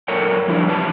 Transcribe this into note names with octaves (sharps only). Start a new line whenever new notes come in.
F#2 A4 A#4 C#5 G5
F3 G3 D4 E4
C3 E3 B4 A5